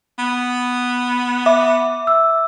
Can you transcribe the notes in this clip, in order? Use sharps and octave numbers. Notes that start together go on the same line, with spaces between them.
B3
E5 D6
E6